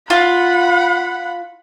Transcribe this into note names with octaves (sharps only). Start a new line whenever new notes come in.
F4 F#5 B5